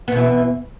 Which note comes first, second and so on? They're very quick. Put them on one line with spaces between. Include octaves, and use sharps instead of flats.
B3 B2 E3